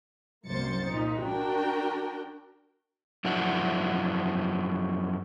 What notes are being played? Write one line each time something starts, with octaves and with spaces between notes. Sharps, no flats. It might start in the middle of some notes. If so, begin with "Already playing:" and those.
C2 F#2 A#3 C5 A6 C#7
A#2 D#4
D4 F#4 A#4 G5
F#2 F3 D4 E4 F#4